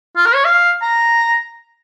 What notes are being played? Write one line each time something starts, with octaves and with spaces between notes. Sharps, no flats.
F4
A#4
C#5
F5
A#5